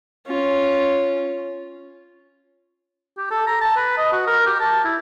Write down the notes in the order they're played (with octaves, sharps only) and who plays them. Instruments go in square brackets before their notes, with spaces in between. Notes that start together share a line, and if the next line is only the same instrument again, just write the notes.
[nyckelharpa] C#4 F4
[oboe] G4
A4
A#5
A5
B4
D#5
F#4
A#4
G4
A5
E4